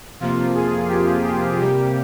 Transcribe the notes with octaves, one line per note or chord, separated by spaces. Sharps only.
F2 C3 F3 A#3 F4
G#4
G4
G4
C3 G3 A#3 G4